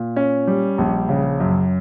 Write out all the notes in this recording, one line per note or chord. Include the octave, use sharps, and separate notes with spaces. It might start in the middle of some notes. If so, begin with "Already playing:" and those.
Already playing: A#2
C#4
G3
A#1
C#3
F#2